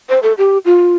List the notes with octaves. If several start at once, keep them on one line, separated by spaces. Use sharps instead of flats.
C5
A4
G4
F4